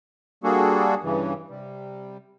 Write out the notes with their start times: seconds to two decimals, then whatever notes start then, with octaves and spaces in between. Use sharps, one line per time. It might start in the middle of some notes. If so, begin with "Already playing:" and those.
0.44 G3 A#3 D4 F#4 G#4 A4
1.03 G2 C#3 E3
1.50 C3 G3